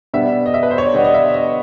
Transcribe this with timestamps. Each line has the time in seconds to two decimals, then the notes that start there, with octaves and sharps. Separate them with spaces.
0.14 B2 G3 B3 D4 E5
0.46 D#5
0.54 E5
0.63 B4
0.71 C5
0.78 C#5
0.86 D5
0.94 B2 G3 B3 D4 D#5
1.05 D#5
1.14 E5
1.34 D#5